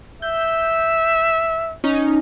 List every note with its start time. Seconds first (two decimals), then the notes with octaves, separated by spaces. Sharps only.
0.22 E5 G6
1.84 C#4 D#4